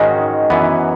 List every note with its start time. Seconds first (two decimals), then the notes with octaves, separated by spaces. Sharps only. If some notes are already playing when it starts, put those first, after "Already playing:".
Already playing: G#2 D#3 G#3 C#4 F#4 D#5
0.50 F#2 E3 B3